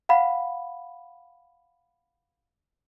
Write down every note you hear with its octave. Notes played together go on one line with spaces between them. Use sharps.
F5 F#5 B5